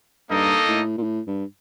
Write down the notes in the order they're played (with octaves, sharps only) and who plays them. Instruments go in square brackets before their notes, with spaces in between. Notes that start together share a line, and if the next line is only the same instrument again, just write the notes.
[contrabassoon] G2 [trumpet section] A#3 D#4 A4 D#5
[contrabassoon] A2
A#2
A2
G2